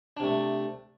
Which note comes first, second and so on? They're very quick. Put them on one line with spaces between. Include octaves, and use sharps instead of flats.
D4 C3 A3